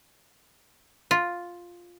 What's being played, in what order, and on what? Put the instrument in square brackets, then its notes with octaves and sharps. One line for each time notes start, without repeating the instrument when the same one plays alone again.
[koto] F4